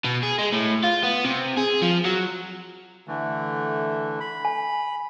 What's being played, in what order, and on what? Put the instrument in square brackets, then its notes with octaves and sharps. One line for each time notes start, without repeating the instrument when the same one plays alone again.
[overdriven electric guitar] B2
G#4
G#3
A2
F4
B3
C3
G#4
F3
F#3
[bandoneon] D3 E3 A3
B5
[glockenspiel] G#5